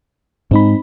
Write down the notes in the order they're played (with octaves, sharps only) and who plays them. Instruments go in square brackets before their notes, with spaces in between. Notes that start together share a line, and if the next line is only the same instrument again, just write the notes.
[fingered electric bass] G#2 G#3 [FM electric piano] C4 D#4 B5